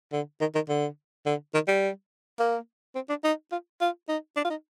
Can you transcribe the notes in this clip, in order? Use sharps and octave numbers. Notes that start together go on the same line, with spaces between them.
D3
D#3
D#3
D3
D3
D#3
G3
A#3
C4
D4
D#4
F4
F4
D#4
D4
F4
D#4